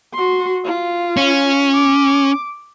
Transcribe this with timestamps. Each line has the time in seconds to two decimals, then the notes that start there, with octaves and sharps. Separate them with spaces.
0.14 F#4 C6
0.64 F4
1.17 C#4
1.74 D6